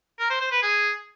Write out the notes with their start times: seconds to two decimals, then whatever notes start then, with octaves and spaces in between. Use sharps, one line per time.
0.19 A#4
0.30 C5
0.41 C5
0.51 B4
0.62 G#4